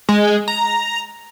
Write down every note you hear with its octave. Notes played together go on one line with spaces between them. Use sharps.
G#3
A#5